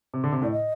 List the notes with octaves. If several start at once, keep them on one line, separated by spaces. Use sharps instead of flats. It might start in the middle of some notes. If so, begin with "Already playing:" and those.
C3
D3
C3
A2 D5
D#5